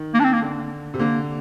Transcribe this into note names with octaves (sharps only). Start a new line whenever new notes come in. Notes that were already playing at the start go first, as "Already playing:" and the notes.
Already playing: D#3
A#3
D4
C4
A#3
D3
C3
D3 A#3